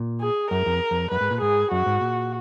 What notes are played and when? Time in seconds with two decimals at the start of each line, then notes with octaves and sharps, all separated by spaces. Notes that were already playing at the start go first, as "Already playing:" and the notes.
Already playing: A#2
0.21 G#4
0.51 F#2 A#4
0.66 F2
0.91 F2
1.11 F#2 B4
1.21 G#2
1.31 A#2
1.41 G#2 G#4
1.71 F#2 F#4
1.86 G#2
2.01 A#2